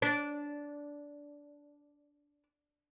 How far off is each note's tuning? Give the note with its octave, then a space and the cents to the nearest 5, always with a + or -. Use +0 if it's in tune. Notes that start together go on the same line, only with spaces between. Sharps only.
D4 -15